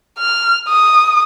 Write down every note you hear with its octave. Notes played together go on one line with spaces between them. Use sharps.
F6
D#6